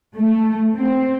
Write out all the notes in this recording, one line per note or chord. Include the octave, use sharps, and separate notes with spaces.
A3
C4